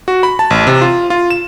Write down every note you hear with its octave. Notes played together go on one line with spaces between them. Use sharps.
F#4
B5
A5
A1
C3
F4
F4
E7